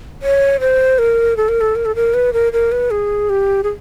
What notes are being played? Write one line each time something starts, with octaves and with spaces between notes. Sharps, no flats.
C#5
C5
A#4
A4
A#4
A4
A#4
A4
A#4
B4
A#4
A#4
B4
G#4
G4
G#4